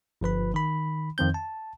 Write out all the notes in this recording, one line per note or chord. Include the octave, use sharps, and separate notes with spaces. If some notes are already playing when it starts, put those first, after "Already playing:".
G1 F3 B4 B5
D#3 B5
F2 D#3 C4 G6
A5